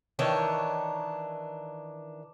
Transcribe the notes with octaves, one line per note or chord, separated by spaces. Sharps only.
D#3 E3 D4 C#5